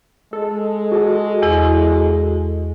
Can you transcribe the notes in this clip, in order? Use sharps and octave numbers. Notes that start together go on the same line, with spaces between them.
G#3 A4
F#4 G#4 A4
E2 E4